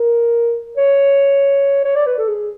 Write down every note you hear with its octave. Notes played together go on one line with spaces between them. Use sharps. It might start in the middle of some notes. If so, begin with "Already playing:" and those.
Already playing: A#4
C#5
C#5
D5
B4
A4
G#4